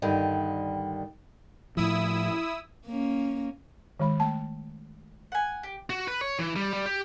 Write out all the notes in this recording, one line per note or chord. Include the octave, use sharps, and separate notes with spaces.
G2 D3 D#3 G3
A2 F3 E4 D#6 E6
A#3 C#4
D#3 G#3 B5
A3 A5
F#5 G#5
G4
F#4
B4
C#5
E3
G3
G3
G4